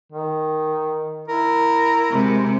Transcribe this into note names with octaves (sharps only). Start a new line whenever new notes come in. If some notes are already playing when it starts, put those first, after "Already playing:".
D#3
E4 A#4
C3 G#3